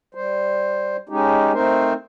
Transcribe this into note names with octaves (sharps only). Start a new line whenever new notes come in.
G3 C5
G#3 C#4 D#4 G4
A3 C4 D#4 A#4 C5